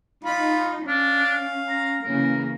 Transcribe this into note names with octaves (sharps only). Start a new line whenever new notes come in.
D#4 F4 B5
C#4 D4 F5
A#5
C#3 E3 A#3 A#4